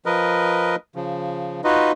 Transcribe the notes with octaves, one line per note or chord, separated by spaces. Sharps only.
F3 A#4 B4 D#5
C#3 F3
D#4 F4 F#4 B4 D#5